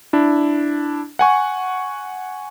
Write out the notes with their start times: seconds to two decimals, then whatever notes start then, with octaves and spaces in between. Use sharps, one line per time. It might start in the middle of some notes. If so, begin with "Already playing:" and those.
0.13 D4 E4
1.19 F#5 G#5 C#6